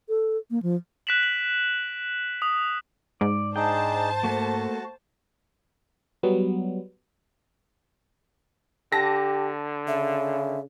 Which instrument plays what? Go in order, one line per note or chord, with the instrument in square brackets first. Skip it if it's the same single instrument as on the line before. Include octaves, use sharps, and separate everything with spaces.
[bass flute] A4
A#3
F3
[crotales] F#6 A#6 B6 D7 E7 F#7
F#7
D#6 F#7
[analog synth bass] G#2 [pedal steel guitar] D5
[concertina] D4 D#4 G#4 [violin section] C5 A5 [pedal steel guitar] G5
[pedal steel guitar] A3 A#3 [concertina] F#4
[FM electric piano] F#3 G3 B3
[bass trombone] D3 [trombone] G4 [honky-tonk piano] A5 A#6
[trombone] C#3 [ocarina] E5